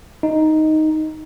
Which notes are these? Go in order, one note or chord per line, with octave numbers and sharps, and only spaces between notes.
D#4